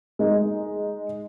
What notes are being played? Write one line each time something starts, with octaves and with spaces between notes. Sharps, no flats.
G#3 D#4